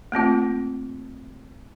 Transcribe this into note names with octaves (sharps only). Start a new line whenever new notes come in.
A3 A#3 C4 F4